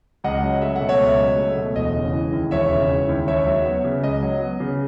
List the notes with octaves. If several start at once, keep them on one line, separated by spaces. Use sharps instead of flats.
C#2 D#5 F#5
F#3
A3 E5
F#5
B2
C#5 E5
C#2
F#3
A3
B2
E1 D#5
C#3
E3
D#2
E1 C#5 E5
C#3
E3
D#2
C#2 C#5 E5
F#3
B3
C#3
C#2 D#5
F#3
B3
C#3